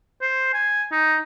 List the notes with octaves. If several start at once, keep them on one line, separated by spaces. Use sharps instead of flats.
C5
G#5
D#4